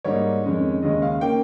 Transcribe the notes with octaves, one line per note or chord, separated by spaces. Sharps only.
G#2 G3 A#3 D#4 C#5
F2 D#3 G#3 C#4
D#2 C#3 G#3 C#4 D#5
F5
D#3 A#3 C#4 G5